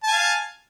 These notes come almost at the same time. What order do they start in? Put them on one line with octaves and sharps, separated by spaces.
A5 G#5 F5